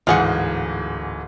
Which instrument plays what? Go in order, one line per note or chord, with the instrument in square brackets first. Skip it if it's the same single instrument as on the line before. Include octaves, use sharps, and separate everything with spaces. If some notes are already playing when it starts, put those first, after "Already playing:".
[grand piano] D1 G#2 E3 [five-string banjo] F4 G#4 F#5